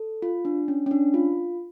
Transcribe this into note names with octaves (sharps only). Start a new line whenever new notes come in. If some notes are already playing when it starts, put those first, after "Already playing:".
Already playing: A4
F4
D4
C#4
C#4
D4
F4